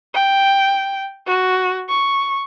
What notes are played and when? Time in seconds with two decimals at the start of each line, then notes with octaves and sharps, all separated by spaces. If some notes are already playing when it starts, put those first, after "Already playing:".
0.14 G5
1.27 F#4
1.89 C#6